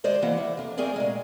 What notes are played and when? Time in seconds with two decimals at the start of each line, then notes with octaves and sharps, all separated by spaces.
0.04 D#2 G#3 C5 D5
0.22 E3 A#3 F#5
0.37 E5
0.57 F2 D4
0.77 A3 C4 G#4 A#4 D5 G#5
0.96 A#2 G#3